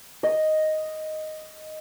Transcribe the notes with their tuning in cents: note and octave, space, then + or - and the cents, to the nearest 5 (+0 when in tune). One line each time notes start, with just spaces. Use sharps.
D#5 +0